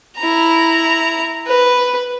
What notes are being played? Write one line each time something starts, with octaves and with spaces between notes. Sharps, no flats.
E4 A#5
B4